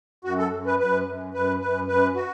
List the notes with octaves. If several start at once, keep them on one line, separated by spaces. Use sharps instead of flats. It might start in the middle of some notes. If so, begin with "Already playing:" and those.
F#2 F#4
A4
F#2
B4
F#2 B4
F#2
F#2 B4
F#2 B4
F#2 B4
F#4